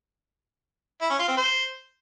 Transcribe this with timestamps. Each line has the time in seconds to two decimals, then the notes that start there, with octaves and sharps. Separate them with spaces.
1.01 E4
1.10 C#4
1.19 F4
1.28 C4
1.37 C5